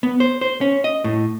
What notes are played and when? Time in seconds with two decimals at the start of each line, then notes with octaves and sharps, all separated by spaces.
0.03 B3
0.20 C5
0.41 C5
0.61 C#4
0.84 D#5
1.04 A2